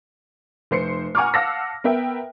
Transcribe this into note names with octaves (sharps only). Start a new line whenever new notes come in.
F1 C5 C7 C#7
F#5 G#5 A#5 C#6 D6 F6
F5 F#5 A5 D6 E6 A#6
B3 A#4 E5 G5